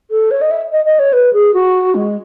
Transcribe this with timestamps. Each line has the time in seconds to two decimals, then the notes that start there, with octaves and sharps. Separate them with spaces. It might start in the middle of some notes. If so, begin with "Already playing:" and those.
0.11 A4
0.31 C#5
0.41 D#5
0.51 E5
0.72 D#5
0.85 D#5
0.99 C#5
1.13 B4
1.33 G#4
1.54 F#4
1.95 G#3